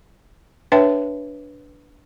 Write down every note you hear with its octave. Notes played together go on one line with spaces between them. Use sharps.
D4 B4 C#5 E5 G5 A5